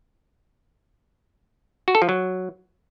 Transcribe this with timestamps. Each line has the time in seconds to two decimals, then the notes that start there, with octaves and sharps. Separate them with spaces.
1.88 F#4
1.95 A4
2.02 F3
2.09 F#3